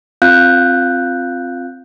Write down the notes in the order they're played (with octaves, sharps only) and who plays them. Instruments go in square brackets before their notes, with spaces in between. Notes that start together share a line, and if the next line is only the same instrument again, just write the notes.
[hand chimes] C4 F4 F5 F#6 G6